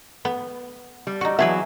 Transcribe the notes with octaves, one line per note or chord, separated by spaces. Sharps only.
B3
G3
D#4 F#4
E3 F#3 B3 G#4 B4 E5